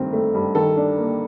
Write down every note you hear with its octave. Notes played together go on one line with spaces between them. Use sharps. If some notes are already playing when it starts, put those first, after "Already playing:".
Already playing: G2 D#3 A3 C4
A3
G2
D#3 A4
D4
A#3